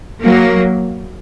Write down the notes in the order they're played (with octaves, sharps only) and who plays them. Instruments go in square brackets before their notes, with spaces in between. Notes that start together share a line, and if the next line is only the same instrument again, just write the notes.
[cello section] F#3 A#3